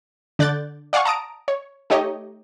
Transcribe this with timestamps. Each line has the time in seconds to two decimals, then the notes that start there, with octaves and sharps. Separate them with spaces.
0.39 D3 D5 F#6 G6 A6
0.93 D5 F5 F#5 G#5 C#6
1.05 A5 A#5 D#6 D7
1.48 C#5
1.90 A3 D#4 G4 C#5 D#5